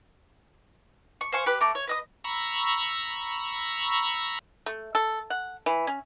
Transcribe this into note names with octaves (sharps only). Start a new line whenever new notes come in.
C#6
C5 F5 G#5 C#6
G4 B4
A3 A#5 D6
C#5
B4 D#5 D#6
A#5 B5 C#6 E6
A3
A4
F#5
E3
C#4